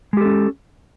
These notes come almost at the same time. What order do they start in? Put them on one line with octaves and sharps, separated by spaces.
G#3 G4 A4 C#4